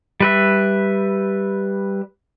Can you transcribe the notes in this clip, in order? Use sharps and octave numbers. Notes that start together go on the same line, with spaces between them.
G3 B4 E5